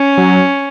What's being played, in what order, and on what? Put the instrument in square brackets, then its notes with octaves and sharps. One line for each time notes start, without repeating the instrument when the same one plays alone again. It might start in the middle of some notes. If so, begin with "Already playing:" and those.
Already playing: [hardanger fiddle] C#4
[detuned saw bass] F#3